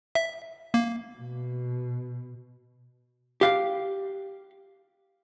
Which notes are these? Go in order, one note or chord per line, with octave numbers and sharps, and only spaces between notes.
E5
A#3
B2
G4 F5